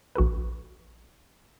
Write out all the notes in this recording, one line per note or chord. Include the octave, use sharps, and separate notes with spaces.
A#1 F#4 A4 B4